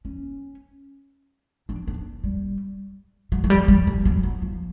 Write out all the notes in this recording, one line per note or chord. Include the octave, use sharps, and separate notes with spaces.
C#4
D4
D4
G3
F#3
F#3
G3
G3
G3
F#3
F#3
F3